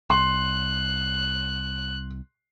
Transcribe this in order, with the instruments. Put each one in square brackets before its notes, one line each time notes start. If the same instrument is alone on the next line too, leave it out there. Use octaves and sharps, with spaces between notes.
[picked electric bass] C2 [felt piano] C6 [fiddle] F#6